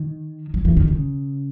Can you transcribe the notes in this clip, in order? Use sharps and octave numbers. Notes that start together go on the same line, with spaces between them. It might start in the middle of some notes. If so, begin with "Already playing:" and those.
Already playing: D#3
F#3
E3
D#3
C#3